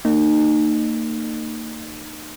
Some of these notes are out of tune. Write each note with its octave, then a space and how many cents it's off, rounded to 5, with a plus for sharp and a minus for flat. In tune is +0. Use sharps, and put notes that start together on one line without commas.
A#3 -35 D#4 -30